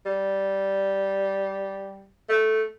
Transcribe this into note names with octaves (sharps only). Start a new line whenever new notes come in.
G3
A3